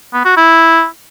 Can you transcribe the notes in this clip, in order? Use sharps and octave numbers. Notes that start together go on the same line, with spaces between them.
B3
F#4
E4